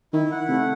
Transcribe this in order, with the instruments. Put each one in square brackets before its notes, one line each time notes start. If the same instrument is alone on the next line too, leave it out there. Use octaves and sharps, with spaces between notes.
[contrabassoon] D#3 [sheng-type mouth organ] E4
[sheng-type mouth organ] F#5
[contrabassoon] C3 [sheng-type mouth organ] A3